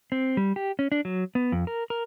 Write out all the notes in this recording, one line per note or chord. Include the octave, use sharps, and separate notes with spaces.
C4
G3
G4
C#4
D4
F#3
B3
F2
A#4
A#4